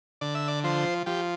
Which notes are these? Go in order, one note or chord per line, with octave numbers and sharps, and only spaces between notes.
D3 D5
E5
D5
F3 C5
F3 G4